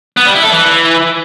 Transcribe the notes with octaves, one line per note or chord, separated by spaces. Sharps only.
B3
G3
E4
A4
E3